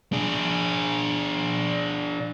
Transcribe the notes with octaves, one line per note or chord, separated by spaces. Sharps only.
D4 G#4